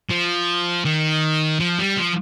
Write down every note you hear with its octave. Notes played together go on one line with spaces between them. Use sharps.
F3
D#3
F3
G3
F3